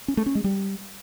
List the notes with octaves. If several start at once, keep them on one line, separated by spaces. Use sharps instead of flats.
C#4
A3
C#4
G#3
G3